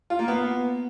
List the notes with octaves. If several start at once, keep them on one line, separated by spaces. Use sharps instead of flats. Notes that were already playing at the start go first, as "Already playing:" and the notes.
F4
A#3
B3